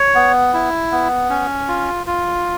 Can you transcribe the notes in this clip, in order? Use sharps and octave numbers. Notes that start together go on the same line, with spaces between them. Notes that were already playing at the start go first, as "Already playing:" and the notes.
Already playing: C#5
B3
E4
B3
C#4
F4
F4